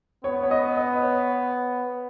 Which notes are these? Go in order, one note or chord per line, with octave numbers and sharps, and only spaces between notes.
B3 C#5
C#5
D#5
D#5
C#5